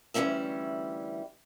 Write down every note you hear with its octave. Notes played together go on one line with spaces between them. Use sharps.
D2 E3 G3 A#3 C#4 E5